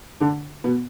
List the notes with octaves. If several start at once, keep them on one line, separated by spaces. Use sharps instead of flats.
D3 D4
B2 B3